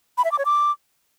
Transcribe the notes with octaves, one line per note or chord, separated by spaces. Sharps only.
B5
E5
D6
C#5
D6